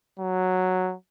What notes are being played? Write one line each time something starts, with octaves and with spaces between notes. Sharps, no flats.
F#3